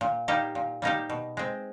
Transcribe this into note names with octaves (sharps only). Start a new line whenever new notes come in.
A#2
G3 A#3 D#4 G4
A#2
G3 A#3 D#4 G4
B2
G#3 C4